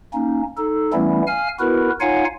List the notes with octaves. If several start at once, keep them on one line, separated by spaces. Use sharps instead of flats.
A#3 C#4 D#4
D#4 A4
E3 G3 A3 B3 C#4 E4
F5 G#5 F6
B3 E4 F#4 A#4 B4
D#4 F4 C#5 F5 F#5 G#5